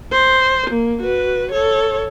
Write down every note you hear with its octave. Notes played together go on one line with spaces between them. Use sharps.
C5
A#3
F#4 B4
A4 C#5